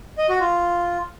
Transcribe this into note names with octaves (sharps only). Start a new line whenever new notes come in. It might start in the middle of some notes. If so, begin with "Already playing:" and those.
D#5
F#4
F4